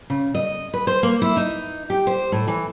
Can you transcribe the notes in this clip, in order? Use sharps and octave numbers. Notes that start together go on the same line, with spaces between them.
C#3
D#5
B4
C5
A#3
E4
D#4
G4
C5
A2
E3